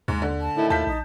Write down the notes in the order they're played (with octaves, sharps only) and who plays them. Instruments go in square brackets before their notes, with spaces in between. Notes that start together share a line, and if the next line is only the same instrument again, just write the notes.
[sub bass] D#2 [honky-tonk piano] G#2
[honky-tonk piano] D3
[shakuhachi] A5
[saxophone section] A2 D#3 E4
[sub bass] D#2 [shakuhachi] F4 [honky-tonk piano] A5 G6 B6
[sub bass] A#1 [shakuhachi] D#4